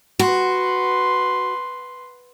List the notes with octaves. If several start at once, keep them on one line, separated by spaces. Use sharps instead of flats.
F#4 B4 C6